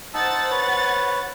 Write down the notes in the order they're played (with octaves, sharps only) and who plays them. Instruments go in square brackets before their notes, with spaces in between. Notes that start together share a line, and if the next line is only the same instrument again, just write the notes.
[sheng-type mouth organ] D#4 A5 E6 [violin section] C5 F#5 A6
[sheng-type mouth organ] B4 C#5